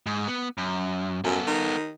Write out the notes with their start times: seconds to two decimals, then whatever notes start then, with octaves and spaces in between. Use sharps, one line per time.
0.06 G#2
0.28 B3
0.58 F#2
1.24 F#2 B3 A4
1.47 D#3